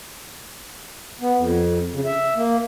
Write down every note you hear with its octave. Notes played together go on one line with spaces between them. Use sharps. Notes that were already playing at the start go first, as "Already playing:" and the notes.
B3
F2
C#3
E5
A#3